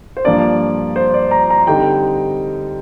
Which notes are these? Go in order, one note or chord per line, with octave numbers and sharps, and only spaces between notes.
C5
G2 F3 A#3 D4 D5
C5
D5
A#5
A#5
D3 G3 C4 D#4 G5